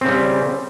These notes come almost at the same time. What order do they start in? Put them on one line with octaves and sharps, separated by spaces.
C4 C#3 G3